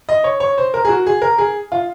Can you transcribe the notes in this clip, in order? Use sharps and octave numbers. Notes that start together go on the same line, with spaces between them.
D#5
C#5
C#5
C5
A#4
G#4
F#4
G#4
A#4
G#4
F4